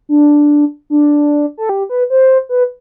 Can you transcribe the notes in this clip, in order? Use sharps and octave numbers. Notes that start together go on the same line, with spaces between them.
D4
D4
A4
G4
B4
C5
B4